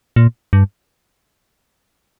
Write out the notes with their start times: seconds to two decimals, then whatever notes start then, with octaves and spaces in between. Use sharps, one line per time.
0.16 A#2
0.53 G2